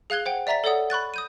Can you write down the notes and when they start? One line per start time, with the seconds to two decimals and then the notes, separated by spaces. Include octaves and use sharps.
0.10 G#4 F5 F#6 G#6 G7
0.26 C5 F#5 G5
0.47 D5 E5 A#5 A6 B6
0.64 A4 C#5 D5 F#5 D#6
0.90 B5 C#6 F#6 A6
1.14 D#6 G6 D#7